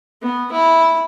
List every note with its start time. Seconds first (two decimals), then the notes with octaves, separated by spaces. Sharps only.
0.22 B3
0.52 E4